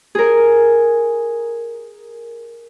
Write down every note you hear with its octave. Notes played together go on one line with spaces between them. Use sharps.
G#4 A#4